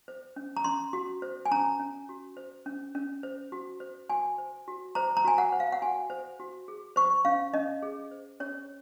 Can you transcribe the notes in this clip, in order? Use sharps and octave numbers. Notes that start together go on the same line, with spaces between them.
C5
C#4
A#5
C#4 C6
F#4
C5
G#5
C#4 A#5
C#4
F#4
C5
C#4
C#4
C5
F#4
C5
F#4 G#5
C5
F#4
C5 A#5
A#5
F#4 G#5
F#5
C5
F5
F#5
F#4 G#5
C5
F#4
G#4
C5 C#6
C#4 F5
C#4 D#5
G#4
C5
C#4 C#5